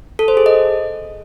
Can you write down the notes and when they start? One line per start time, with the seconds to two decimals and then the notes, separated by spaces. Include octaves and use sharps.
0.19 A4
0.28 C5
0.37 G#4
0.46 D#5